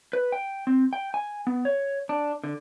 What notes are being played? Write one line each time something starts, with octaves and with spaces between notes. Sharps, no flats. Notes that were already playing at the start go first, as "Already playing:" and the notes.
B4
G5
C4
G5
G#5
B3
C#5
D4
D3